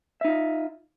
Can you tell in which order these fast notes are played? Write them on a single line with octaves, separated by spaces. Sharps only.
E5 D#4 F4